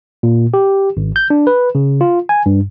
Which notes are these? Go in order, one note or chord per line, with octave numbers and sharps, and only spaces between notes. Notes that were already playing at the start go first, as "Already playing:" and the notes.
A#2
G4
G#1
G6
D4
B4
C#3
F4
G#5
G2